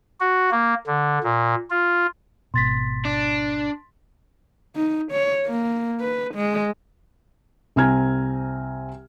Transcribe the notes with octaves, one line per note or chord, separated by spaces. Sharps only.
F#4
A#3
D3
A#2
F4
G#1 B2 C6 A6 B6
D4
D#4
C#5
A#3
B4
G#3
C2 C4 G#5 A#5 F6 G#6